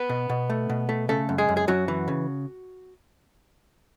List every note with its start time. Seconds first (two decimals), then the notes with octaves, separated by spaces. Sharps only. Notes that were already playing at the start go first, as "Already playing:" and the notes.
Already playing: B3 B4
0.09 B2
0.29 B2
0.50 A3
0.69 B2
0.89 A3
1.09 C#3 A3 A4
1.29 F#2
1.38 G#3 G#4
1.49 F#2
1.57 G#4
1.68 F#2 F#3 F#4
1.88 E3
2.08 C#3